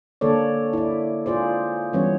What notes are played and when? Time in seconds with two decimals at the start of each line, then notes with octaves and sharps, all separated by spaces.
0.21 D3 A#3 A4 C#5 D5
0.73 E4 D5
1.26 F4 G#4 C5 D5
1.93 E3 G3 B3 C#4 C#5